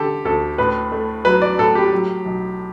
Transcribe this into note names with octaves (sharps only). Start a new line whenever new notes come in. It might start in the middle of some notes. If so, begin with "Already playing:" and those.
Already playing: D3 G4 A4
D2 A4
A2 B4
A3
F#3 B4
D5
A2 A4
G4
F#3
B1